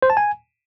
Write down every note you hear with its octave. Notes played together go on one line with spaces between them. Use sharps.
C5
A5
G#5